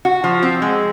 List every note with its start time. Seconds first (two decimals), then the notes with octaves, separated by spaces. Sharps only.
0.05 F#4
0.24 F3
0.43 C4
0.62 G#3